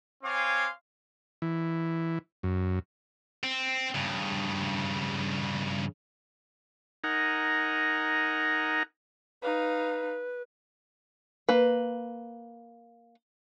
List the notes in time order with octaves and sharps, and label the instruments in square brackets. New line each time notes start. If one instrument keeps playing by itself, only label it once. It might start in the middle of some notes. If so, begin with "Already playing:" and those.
[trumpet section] C4 C#5 F5 G#5 C6 D6
[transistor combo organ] E3
F#2
[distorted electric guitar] C4
G2 C#3
[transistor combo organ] D#4 A#4 F#5 G#5 A#5
[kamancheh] D#4 F5 [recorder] B4
[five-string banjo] A#3 B4